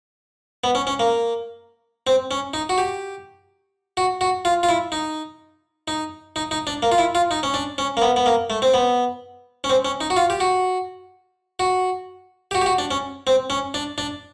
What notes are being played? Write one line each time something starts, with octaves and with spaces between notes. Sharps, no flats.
B3
C#4
C#4
A#3
C4
C#4
D#4
F#4
G4
F#4
F#4
F4
F4
E4
D#4
D#4
D#4
D#4
D4
A#3
F4
E4
F4
D#4
C#4
D4
C#4
A#3
B3
B3
A#3
A3
C4
B3
C#4
C4
C#4
D#4
F#4
F4
G4
F#4
F#4
G4
F#4
G4
F#4
D4
C#4
C4
C#4
D4
D4